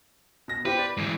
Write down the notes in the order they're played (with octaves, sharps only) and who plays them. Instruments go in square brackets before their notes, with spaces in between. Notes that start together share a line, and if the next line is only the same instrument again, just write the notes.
[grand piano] B2 A#6
[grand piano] G4 C5 B5 [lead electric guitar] B4
[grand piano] D5
[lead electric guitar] G#2 E3